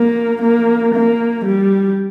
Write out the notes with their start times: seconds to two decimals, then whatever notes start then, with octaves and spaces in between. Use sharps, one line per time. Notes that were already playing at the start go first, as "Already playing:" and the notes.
Already playing: A#3
0.42 A#3
0.95 A#3
1.45 G3